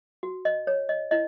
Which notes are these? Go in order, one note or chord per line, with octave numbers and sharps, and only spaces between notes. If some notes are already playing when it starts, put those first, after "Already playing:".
F#4
D#5
C#5
D#5
E4 D#5